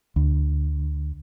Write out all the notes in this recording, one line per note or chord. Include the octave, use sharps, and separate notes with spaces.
D2